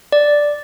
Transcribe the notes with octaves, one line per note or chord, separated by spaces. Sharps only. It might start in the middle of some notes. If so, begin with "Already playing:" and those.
D5